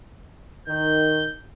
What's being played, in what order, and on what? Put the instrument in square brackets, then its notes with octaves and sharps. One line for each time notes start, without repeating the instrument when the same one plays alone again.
[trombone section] D#3 [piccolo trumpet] G6